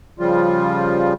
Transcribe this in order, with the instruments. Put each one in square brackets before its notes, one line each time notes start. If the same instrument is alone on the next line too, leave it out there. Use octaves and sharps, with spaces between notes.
[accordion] C#3 F3 G3 F4